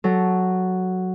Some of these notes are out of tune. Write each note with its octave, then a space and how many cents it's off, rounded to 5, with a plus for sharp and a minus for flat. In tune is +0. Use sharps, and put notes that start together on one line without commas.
F#3 +0 A4 -10